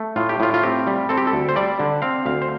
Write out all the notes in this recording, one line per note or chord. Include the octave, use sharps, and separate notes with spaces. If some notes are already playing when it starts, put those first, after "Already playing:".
Already playing: A3
A2 F4
G4
A2 F4
F4
C4 G4
G3
C4 A4
G4
A4
D2
C5
G3 D5
D3
C4 F5
D2 F5
C5